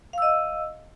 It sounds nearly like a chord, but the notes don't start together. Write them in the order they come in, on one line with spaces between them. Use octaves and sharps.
F5 E6 D#5